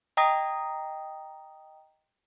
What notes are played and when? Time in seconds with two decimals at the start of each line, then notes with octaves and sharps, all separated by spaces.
0.17 D#5 G5 A#5 D#6 A#6